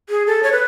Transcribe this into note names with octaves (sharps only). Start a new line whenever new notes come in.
G#4
A4
C#5
B4